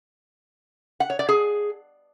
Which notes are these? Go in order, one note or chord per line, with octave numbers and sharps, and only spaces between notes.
F#5
C#5
D5
G#4